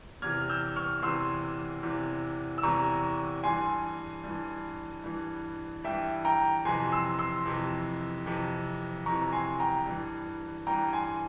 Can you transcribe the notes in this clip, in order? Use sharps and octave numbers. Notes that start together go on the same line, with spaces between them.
E2 C3 E3 F6 G#6
F6
E6 G6
C#6 F6
E2 C3 E3 C6 E6
E2 C3 E3
E6
E2 C3 E3 A#5 C#6
G2 E3 G#5 C6
G2 E3
G2 E3
G2 E3 E5 G5
G5 A#5
F2 C3 E3 G#5 C6
C6 E6
C6 E6
F2 C3 E3
F2 C3 E3
F2 C3 E3 A#5 C#6
G#5 C6
G5 A#5
G2 E3
G2 E3 G5 A#5
G#5 C6